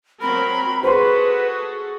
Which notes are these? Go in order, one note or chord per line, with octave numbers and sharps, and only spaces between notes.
F#3 C4 A#4 B5
F#4 G#4 A4 B4 C5 B5 C6